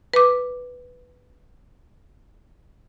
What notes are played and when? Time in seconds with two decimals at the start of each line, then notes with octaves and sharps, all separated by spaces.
0.14 B4 D6